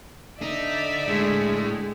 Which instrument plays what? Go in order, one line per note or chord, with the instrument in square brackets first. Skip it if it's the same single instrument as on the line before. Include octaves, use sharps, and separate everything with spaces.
[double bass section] D3 [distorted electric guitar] D#4 [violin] D5 E5
[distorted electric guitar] A2 [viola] G#3